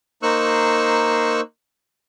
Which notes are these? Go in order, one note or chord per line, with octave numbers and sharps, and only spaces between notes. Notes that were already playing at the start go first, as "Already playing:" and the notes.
A#3 D#4 C5 C#6 E6 F#6